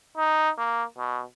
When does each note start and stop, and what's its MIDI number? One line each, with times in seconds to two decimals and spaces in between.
0.17 0.50 63
0.58 0.84 58
0.98 1.22 47